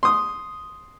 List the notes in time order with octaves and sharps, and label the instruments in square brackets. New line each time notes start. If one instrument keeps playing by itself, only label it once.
[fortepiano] C6 D#6